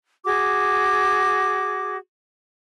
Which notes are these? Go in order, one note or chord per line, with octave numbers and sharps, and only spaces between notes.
F#4 G#4 D6